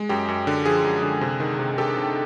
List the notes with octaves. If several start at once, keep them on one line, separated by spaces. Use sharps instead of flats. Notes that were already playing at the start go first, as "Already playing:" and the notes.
Already playing: G#3
F#2 G4
F#2
D3
F3 G#4
F#2
D3
C3
D#3
C3
C3 G4 A4
C3